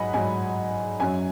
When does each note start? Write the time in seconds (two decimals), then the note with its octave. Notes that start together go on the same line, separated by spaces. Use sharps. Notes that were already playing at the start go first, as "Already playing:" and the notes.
Already playing: G#2 F#3 D#5 F#5 G#5 B5
0.14 G#2 F#3 G#5
1.00 F#2 F#3 G#5